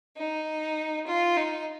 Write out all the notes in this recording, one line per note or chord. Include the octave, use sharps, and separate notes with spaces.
D#4
F4
D#4